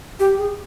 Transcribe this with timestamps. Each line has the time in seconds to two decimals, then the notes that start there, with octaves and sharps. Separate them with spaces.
0.20 G4
0.38 G#4